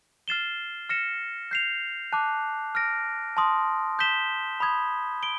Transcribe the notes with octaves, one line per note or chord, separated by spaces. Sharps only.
F6 A6 C7 E7 G7
F6 A#6 C#7 E7
G6 C7 F7
A5 D6 F#6
F6 A#6 D7
A5 C6 D#6
D#6 G6 B6 E7 G7
B5 D#6 G#6
D7 G7